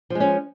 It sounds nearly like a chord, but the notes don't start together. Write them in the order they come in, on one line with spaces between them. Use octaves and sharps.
F3 G#3 C#4